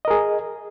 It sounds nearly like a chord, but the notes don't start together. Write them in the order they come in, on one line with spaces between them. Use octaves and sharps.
D#5 A#4 G#4